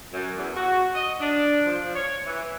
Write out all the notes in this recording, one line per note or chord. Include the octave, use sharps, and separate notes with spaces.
F#2
E2
F#4
D#5
D4
F3
C#5
E3